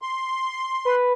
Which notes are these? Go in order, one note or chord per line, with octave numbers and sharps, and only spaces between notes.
C6
B4